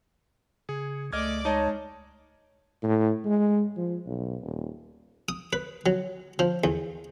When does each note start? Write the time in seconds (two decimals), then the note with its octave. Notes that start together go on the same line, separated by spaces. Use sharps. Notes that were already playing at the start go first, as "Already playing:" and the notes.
0.69 C#3 G#4
1.13 C#2 A3 D5 D#5 D6 F6 G#6
1.45 G#3 D#4 C#5 D#5 A5
2.83 A2
3.25 G#3
3.77 F3
4.07 B1
4.41 D#1
5.29 D#6
5.53 B4
5.86 F#3
6.39 F3
6.64 E2